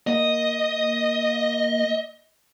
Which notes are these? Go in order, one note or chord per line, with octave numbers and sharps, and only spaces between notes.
A#3 D#5